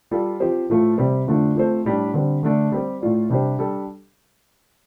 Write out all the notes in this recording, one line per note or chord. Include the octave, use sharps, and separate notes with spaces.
G3 F4 A4
F3 C4 G4 C5
A2 F3 A3 F4 A4
C3 G3 C4
F2 D3 A3 D4 F4
F3 A3 C4 A4 C5
A2 G3 D4
D3 G3 C4
D3 A3 D4 A4
G3 C4 G4
A2 A3 F4 D5
C3 G3 D4 G4 C5
G3 D4 A4